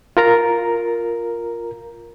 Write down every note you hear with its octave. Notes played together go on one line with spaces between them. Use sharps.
F4 A#4 A#5